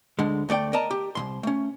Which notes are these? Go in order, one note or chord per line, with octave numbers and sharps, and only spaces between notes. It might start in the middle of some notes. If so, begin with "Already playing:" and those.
D2 D3 G#3
D2 A3 D5 G5
A#4 D5 D#5 A5 A#5
G4
C2 E3 C6
A3 C#4